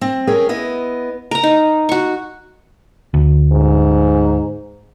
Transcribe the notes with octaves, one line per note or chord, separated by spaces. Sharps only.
C4
C#4 G#4 A#4 G5
B3 E4 D#5
A#4 A#5
D#4
F#4 C#6
D2
G#2